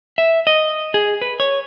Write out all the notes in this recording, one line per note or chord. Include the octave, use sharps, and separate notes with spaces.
E5
D#5
G#4
B4
C#5